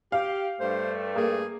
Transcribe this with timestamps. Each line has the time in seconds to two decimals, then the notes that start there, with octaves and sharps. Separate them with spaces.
0.12 G4 F5
0.60 G2 A3 C5
1.16 A#3 G#4